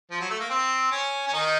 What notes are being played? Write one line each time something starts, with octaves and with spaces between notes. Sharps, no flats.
F3
F#3
A3
A#3
C4
C#4
C#4
D#3 D#4